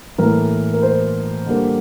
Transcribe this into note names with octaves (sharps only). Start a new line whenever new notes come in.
A2 E3 A#3 A#4
A#4
C5
D3 G3 A#3